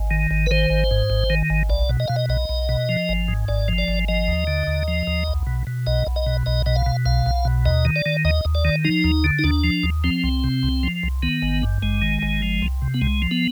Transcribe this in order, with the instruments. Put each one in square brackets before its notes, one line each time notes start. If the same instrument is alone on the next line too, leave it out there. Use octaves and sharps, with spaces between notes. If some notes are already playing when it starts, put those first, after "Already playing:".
Already playing: [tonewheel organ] G#1
D#3
G#1
B4
D#3 C5
G#1
G#2
G#1
D#3
G#1
B1 D5
B2
D#5
B2 F5
D#5
B1 D#5
B1
B2
F3
G#1
G#2
G#1 D5
F3
D5
G#1
F3 D#5
D#2
D3
D#2
F3
D#2
B1
B2
B2
B1 D#5
B1
D#5
B2
B1 D#5
B2 D#5
F5
B2
B1 F5
B1
B2
D#2 D#5
D#3
D5
D#3
D#2 D#5
D#2
D5
D#3
F3 D#4
D#2
D3
D#4
D#2 D4
F3
D#2
F3 C4
C2
C3
C2
F3
C2
D#3 B3
G#1
G2
G#1 G#3
D#3
G#1
F3
C2
C3
B3
C2 G#3
F3
B3